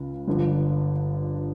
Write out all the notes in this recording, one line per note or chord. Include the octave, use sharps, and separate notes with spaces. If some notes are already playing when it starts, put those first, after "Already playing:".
Already playing: C#2 C#3
G1 G2 D3 F3